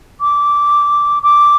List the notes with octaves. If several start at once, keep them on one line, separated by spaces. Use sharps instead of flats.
D6
D6